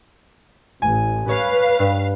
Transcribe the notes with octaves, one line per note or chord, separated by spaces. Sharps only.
A1 G#5
B4 C#5 F5
G2